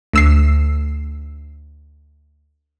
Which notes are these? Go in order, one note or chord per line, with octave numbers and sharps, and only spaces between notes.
D2 E6 C7